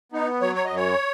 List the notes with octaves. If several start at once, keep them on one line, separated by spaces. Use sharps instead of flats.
B3 D#4
F#3 C#5
C#5
F#2 D#5
C#5